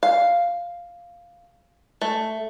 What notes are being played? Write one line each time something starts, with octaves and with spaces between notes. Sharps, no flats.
F5
A3